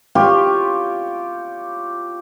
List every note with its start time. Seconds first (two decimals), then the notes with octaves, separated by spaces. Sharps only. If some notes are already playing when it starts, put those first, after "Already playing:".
0.15 F4 G4 C#5